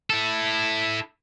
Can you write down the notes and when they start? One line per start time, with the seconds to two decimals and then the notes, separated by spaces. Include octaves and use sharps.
0.10 E4 A4